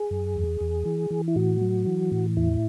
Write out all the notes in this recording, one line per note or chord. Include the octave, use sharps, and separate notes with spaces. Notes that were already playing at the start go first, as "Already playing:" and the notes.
Already playing: G#4
F#2
E2
E2
E3
E3
E4
A2 F#4
F#3
E3
A2
E2 E4